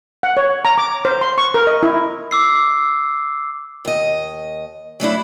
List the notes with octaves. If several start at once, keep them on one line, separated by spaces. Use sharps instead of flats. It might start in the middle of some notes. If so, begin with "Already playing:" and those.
F#5
C#5
A#5
D6
C5
C6
C#6
A#4
D#5
E4
D6 E6 C7
D#2 D#5
F#3 A3 D4 E4